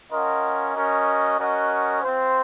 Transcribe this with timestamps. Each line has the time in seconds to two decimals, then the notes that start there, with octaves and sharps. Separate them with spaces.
0.11 C#4 F4 A#4 D#5 F#5
0.74 C#4 F#4 A#4 D#5
1.38 C#4 F#4 A#4 D#5 F#5
2.02 C4 F4 C5